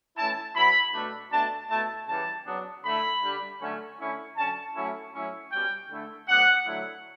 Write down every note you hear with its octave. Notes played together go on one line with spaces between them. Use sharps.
E3 A3 C#4 E4 A5
F#3 B3 E4 B5
B2 A3 D4
B2 A3 D4 A5
B2 A3 E4 A5
C#3 E3 G3 A5
C#3 F#3 B3 D4
D3 A3 E4 B5
D3 G3 D4
D3 F#3 A3 C#4
D3 A3 C#4 E4
D3 F#3 C#4 A5
F#3 A3 C#4 E4
A2 F#3 C#4 E4
B2 G3 C#4 G5
D3 A3 E4
A2 F#3 B3 D4 F#5
D3 F#3 A3 E4